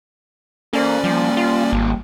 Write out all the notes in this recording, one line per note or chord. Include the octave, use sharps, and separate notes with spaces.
A#3 C#4 A4 C5 D5
F3 G3 A#3
F4
G#1